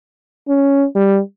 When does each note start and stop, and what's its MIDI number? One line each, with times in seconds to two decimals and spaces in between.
0.48 0.86 61
0.96 1.20 55